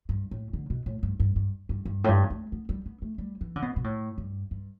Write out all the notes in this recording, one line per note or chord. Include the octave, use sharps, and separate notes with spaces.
G2
A2
D3
B2
A2
G2
G2
G2
G2
G2
A2
G2
A3
B3
G3
B3
A3
G3
E3
D3
B2
B2
A2
G2
G2